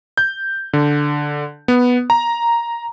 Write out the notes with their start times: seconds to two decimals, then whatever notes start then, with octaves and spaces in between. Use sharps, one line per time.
0.18 G6
0.73 D3
1.68 B3
2.10 A#5